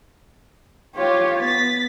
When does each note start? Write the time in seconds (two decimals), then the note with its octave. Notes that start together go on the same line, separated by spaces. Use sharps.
0.96 F4 G4 C#5
1.42 B3 A6 B6